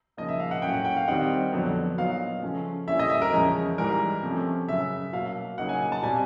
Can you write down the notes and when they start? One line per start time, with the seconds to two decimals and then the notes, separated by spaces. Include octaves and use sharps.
0.17 C#3 F3 A#3 D#4 D#5
0.29 E5
0.40 F5
0.51 F#5
0.62 A2 F#3 A#3 C#4 G5
0.74 F#5
0.85 G5
0.96 F5
1.07 D#3 G3 C4 D#4 F#5
1.53 F2 D3 F#3 B3
1.98 A#2 F#3 B3 D#4 F5
2.42 C#3 F3 A3 C#4 F4
2.88 D3 G3 A#3 C#4 E4 E5
2.99 D#5
3.10 E5
3.22 A#4
3.32 E2 C#3 F3 G#3 C#4
3.78 G#2 E3 G3 A#4
4.23 C3 F3 A3 C#4
4.68 F#2 C#3 F#3 E5
5.13 B2 F#3 A#3 F5
5.58 C#3 F#3 A#3 D#4 F#5
5.69 G#5
5.92 A5
6.02 B2 G3 C4 G#5